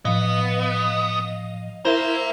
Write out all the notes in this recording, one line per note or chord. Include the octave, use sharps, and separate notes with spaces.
A2 F3 B3 D#5 F5
E4 A#4 C5 E5 F5 A#5